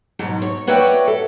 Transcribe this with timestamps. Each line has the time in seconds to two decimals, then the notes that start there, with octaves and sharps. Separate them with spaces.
0.19 G#2 B2 F#3
0.42 C#5
0.67 F#4 B4 C#5 D5 E5 G5
1.08 A4